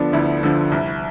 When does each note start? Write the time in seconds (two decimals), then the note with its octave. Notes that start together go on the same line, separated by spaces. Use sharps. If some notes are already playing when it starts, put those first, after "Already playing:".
Already playing: D3 F3 B3 D4 A4
0.13 D2 E4
0.43 D3 F3
0.72 C2